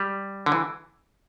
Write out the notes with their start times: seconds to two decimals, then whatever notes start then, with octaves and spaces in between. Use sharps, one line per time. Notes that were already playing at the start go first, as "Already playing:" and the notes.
Already playing: G3
0.46 D3
0.52 E3